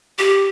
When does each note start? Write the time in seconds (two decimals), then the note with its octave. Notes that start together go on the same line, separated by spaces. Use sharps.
0.19 G4